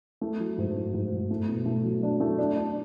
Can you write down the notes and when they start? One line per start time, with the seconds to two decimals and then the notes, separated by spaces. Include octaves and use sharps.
0.21 A3
0.40 F#3
0.58 G#2
0.76 A3
0.94 G#2
1.12 G#2
1.31 A3
1.49 B2
1.66 A3
1.84 F#3
2.03 D4
2.20 A3
2.38 D4
2.57 D4